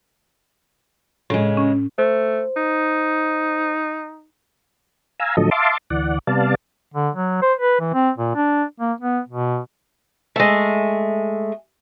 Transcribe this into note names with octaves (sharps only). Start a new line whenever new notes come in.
A2 C#3 G#3
C#4
A3 C5
D#4
F5 G#5 A#5 E6
A2 D3 F3 F#3 A4 D#5
E5 F5 A5 C6 D6
D2 E3 D5 F#5
C3 G3 B3 D5 F5 A5
D3
F#3
C5
B4
E3
C4
A#2
D4
A#3
B3
B2
G#3 A3